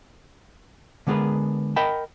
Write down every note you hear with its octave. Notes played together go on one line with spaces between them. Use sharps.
D3 G#3 B3 G#4 A#4 B4
A#4 D#5 F#5 G5 A5 B5